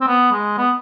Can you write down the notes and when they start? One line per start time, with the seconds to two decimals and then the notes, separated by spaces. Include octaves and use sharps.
0.01 C4
0.07 B3
0.32 G#3
0.58 B3